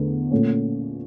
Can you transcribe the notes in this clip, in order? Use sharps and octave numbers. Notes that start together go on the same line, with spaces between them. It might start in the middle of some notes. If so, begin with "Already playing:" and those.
Already playing: E2 D3 A3
A#2 A3 C#4